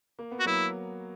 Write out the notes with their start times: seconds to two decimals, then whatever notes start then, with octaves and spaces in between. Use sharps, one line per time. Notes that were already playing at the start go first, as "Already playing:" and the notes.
0.19 A#3
0.31 B3
0.40 F#4
0.46 F#3 A#3 E4